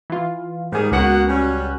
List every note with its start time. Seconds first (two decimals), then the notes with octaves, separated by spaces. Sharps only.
0.10 E3 F4
0.72 G#2 D#3 G3 G#4
0.91 C#2 A#3 B3 F#4 F#5 F#6
1.29 G3 C#4